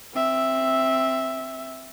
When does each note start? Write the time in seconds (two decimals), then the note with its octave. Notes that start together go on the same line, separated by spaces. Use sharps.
0.14 C4 E5